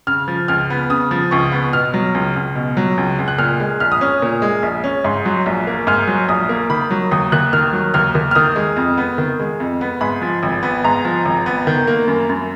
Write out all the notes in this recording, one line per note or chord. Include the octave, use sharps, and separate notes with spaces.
C#3 F6
F3
C#2 F6
B3
C#3 D#6
F3
C#2 C#6
B3
B2 F6
F#3
C#2
C#2
B2
F#3
C#2
C#2
F#6
A#2 F6
G#3
A#1 F6
D#6
C#4 F6
A#2
G#3
A#1
C#4
G#2
F#3
A#1
A#3
G#2 F6
F#3
A#1 D#6
A#3
D#3 B5
F#3
D#2 D#6
D#2 F#6
D#3 F6
F#3
D#2 F6
D#2
F6
D#3 D#6
G#3
F2
B3
D#3
G#3
F2
B3
G#2 B5
F3
G#1
B3
G#2 A#5
F3
G#1
B3
D#3
A#3
F#2
F#2